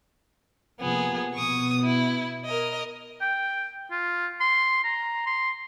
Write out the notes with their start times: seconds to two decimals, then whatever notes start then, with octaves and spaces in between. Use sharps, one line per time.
0.80 C3 F3 A#3 B3 G#4
1.34 B2 B3 C#6 D#6
1.82 E4
2.45 A#4 D#5
3.21 G5
3.91 F4
4.41 C6
4.84 A#5
5.26 C6